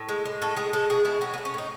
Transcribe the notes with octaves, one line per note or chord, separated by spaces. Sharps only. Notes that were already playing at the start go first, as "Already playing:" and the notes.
Already playing: A2
G#3
G#3
A2 A4
G#3 G#4
G#3 A4
B2 G#4
G#3 E4
F#3 C#4
B3
A3
C#4
A2 D#4